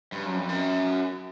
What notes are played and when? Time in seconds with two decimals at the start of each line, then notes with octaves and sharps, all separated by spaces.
0.12 G2
0.25 F#2
0.36 F2
0.49 F#2